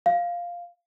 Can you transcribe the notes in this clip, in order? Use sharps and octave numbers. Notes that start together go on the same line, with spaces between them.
F5